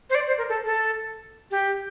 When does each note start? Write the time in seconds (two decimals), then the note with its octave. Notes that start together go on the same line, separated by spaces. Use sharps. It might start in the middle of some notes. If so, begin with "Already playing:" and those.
0.10 C5
0.15 D5
0.27 C5
0.38 A#4
0.49 A4
0.66 A4
1.51 G4